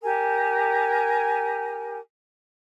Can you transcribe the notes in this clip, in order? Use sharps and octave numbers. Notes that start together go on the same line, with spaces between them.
G4 A#4 G#5